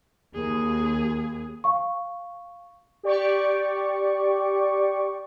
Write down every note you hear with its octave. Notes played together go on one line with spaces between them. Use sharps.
D#2 G#4
F5 C#6
G4 D5 C#6